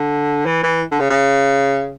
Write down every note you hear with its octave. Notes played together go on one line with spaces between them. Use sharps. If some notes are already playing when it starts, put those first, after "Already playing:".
Already playing: D3
E3
E3
D3
C#3
C#3